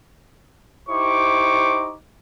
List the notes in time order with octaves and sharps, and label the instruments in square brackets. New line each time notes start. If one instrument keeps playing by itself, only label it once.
[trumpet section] D#4 E4 G4 C5 C#6 D6